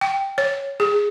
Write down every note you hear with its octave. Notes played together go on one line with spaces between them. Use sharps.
G5
C#5
G#4